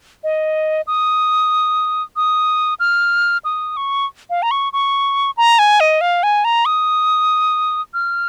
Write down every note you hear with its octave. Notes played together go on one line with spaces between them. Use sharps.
D#5
D#6
D#6
F6
D#6
C#6
F5
A#5
C#6
C#6
A#5
G#5
D#5
F5
G#5
A#5
D#6
F6